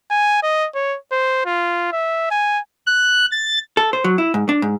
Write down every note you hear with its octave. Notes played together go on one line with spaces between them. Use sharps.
G#5
D#5
C#5
C5
F4
E5
G#5
F#6
A6
A4
C5
F#3
E4
G#2
D4
G#2